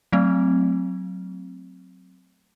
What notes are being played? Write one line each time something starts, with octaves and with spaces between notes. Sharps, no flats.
F#3 A3 C4